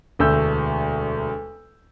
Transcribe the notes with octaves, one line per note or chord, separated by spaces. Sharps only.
E1 D2 A3 E6 G6